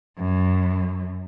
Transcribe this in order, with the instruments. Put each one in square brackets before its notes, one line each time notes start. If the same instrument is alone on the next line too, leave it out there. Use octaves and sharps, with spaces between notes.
[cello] F#2